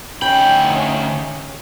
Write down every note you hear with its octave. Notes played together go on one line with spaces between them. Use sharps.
D2 C#4 D#4 G5 B5